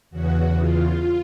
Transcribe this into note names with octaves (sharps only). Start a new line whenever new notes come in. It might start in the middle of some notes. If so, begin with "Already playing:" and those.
E2 C#3 E3 F#4
F4